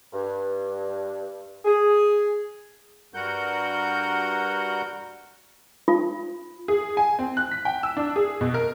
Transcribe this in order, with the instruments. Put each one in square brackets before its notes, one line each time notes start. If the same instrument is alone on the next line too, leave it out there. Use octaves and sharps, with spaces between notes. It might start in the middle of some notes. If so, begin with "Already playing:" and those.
[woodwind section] G2
G#4
[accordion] G2 G3 F#4 A#4 F#5 G6
[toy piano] F4
[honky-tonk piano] G#4
G#5
C4
F#6
B6
G5
E6
D4
G#4
B2
A#4